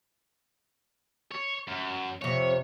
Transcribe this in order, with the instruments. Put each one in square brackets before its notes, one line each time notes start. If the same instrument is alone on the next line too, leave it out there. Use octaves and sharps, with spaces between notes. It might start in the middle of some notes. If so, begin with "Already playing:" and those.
[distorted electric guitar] C#5
F#2
[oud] F2 C3 [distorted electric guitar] C#5